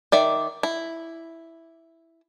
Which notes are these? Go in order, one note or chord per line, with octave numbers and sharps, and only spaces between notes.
D#3 D5 E5
E4